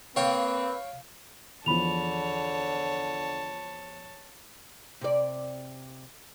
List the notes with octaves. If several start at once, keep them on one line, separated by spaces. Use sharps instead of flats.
A#3 C4 B4 C#5 F5 G5
E2 D3 F3 C#5 A5 B5 F7
C3 D5